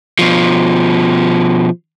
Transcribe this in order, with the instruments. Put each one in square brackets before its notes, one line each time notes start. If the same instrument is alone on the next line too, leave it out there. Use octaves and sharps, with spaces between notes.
[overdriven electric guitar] B2 F3